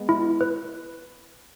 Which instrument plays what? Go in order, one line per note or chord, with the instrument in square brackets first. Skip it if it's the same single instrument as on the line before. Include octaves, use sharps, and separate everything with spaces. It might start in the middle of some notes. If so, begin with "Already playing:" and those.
Already playing: [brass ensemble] G#3 B3
[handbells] E4
B4